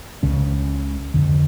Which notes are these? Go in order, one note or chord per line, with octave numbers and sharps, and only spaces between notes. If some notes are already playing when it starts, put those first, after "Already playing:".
C#2 C#3 C#4
F2 D3